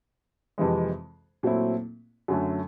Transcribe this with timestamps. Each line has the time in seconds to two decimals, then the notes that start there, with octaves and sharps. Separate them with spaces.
0.58 F2 C3 E3 G#3
1.43 A#2 F#3 A3 C4 E4
2.28 F#2 D3 F#3 A3